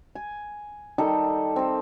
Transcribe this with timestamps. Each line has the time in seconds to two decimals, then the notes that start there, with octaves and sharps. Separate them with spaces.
0.15 G#5
0.98 D#3 G3 D#4 A4
1.56 C4 A4